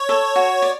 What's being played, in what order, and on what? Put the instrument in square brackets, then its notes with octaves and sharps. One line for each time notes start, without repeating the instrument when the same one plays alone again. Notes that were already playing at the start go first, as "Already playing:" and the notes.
Already playing: [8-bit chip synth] C#5
[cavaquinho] A4
F#4
D5